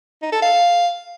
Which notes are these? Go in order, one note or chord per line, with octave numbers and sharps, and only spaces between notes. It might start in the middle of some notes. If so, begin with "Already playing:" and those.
D#4
A4
F5